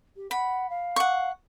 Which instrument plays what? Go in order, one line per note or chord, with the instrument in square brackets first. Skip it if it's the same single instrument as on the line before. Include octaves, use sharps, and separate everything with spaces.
[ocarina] G4
[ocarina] F#5 [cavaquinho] B5
[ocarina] F5
[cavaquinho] F#5 C#6